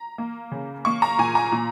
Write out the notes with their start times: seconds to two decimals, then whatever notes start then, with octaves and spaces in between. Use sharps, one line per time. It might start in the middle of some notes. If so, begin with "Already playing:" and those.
Already playing: A#5
0.18 A#3
0.52 C#3
0.85 A#3 C#6
1.02 A#5
1.18 A#2 G#5
1.35 A#5
1.52 A#2